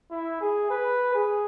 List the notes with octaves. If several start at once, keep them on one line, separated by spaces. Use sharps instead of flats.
E4
G#4
B4
G#4